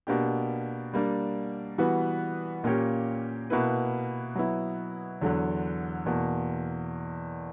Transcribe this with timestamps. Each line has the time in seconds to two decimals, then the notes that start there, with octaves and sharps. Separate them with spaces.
0.07 B2 A#3 D4 G4
0.93 G3 A#3 D4
1.78 E3 G3 B3 F#4
2.64 A#2 A#3 C#4 G4 C#5
3.50 B2 A#3 E4 B4
4.35 F#3 B3 E4
5.21 E2 D3 F#3
6.06 E2 B2 A#3